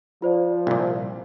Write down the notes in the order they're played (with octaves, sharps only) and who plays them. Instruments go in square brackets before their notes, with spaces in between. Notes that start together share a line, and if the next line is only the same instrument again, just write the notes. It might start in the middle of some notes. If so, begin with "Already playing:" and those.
[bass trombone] F3 [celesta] F4 C5 D5
[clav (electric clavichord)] C2 A#2